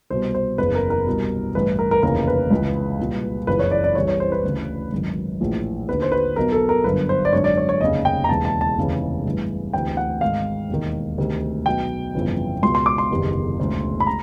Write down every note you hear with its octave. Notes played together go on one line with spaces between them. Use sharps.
C2 B2 C5
C5
F#1 E2 C#3 E3 B4
A#4
A#4
C2 B2
A1 G2 E3 B4
A#4
A#4
F1 D#2 C#3 E3 A#4
B4
C#2 C#3 E3
C2 A#2
F#1 F2 C#3 E3 B4
C#5
D5
D5
C2 C3 E3 C#5
C#5
C5
B4
D2 C#3 E3
G#1 F#2 D#3
A#1 A2 E3
D#2 D3 B4
C5
B4
B1 B2 A#4
A4
A#4
G1 F#2 D3 B4
C5
D5
G#1 F#2 D3 C#5
D5
C#5
C#5
F1 D#2 C#3 D#5
G5
A#5
E1 D#2 C#3 E3 A5
A5
A5
F1 D#2 C#3 E3
A1 G2 E3
D2 C3 E3 G5
F#5
G#1 G#2 D#3 F5
E1 D#2 D#3
D2 C3 D#3
B1 B2 G5
G1 F2 C#3 E3
C#2 B2 C6
C6
D6
C6
F#1 E2 C3 D#3
E1 D2 C#3
B5
A#5